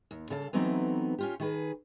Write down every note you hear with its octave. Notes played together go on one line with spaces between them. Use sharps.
D#2
C#3 A4 F5
E3 F#3 A3 B3 C4 D#4
C#4 F4 G4
D#3 G#4 B4